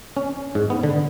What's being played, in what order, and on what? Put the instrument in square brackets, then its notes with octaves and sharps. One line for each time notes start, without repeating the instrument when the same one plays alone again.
[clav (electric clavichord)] C#4
G#2
B3
D3